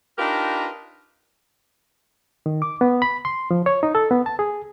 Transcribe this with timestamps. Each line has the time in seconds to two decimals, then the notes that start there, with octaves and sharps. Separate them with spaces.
0.18 D4 D#4 F4 G4 A#4 B4
2.46 D#3
2.62 D6
2.81 B3
3.02 B5
3.25 C6
3.51 F3
3.66 C#5
3.83 D#4
3.95 A4
4.11 B3
4.26 A5
4.39 G#4